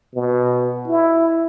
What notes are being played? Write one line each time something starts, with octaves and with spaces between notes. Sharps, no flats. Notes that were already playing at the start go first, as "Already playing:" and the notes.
B2
E4